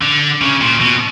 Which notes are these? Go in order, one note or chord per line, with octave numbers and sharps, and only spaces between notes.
D3
C#3
A#2
B2